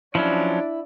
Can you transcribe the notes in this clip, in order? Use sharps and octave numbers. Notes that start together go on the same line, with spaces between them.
F3 F#3 C#4 D4 E4